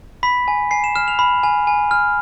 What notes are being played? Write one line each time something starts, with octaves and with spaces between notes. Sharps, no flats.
B5 B6
G#5
G#5 C7
E7
F6 E7
F7
B5
G#5
G#5
F6